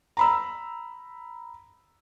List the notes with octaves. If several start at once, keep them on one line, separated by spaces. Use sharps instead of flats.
A#5 B5 E6